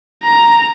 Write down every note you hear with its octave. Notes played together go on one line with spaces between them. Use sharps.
A#5